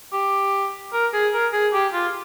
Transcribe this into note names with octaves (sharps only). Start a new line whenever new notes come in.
G4
A#4
G#4
A#4
G#4
G4
F4